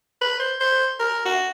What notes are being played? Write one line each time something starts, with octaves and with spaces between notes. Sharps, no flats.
B4
C5
C5
A#4
F#4